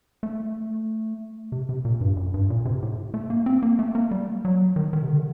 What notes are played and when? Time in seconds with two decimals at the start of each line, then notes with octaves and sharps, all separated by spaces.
0.23 A3
1.52 C3
1.69 C3
1.85 A#2
2.01 G2
2.16 F#2
2.34 G2
2.50 A#2
2.65 C3
2.82 A2
3.14 A3
3.30 A#3
3.46 C4
3.63 A#3
3.79 A3
3.95 A#3
4.11 G3
4.45 F#3
4.76 D#3
4.93 D#3
5.03 C3
5.09 D3